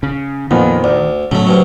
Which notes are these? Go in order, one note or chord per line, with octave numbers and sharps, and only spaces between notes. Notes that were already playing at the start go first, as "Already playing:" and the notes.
C#3
F2 A#2 D#3 B3
D2 D5
A2 C#3 F#3 A3
D2 G2 F#3